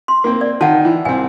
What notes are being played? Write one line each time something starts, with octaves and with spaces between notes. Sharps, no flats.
C6
A#3 C4
D5
D#3 C#5 F#5 A5
E3
C2 C4 G#5